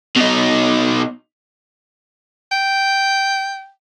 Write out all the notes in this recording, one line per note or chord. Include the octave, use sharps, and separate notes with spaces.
B2 D#4
G5